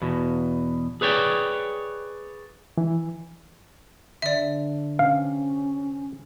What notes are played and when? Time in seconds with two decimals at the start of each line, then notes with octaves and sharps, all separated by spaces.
0.02 E2 B2
1.01 G#4 B4 C#5 D5 G5
2.78 E3
4.22 D3 D5 E5
4.99 C3 C#4 F5